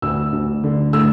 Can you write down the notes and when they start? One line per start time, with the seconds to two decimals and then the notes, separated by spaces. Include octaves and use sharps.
0.02 D2 E6
0.32 D2
0.64 D3
0.93 A3 E6